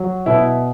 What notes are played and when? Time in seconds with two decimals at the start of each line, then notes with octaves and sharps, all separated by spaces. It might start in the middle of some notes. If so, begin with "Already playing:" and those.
Already playing: F#3
0.26 B2 E4